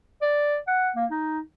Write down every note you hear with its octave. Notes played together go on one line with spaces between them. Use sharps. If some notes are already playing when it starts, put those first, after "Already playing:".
D5
F#5
A#3
D#4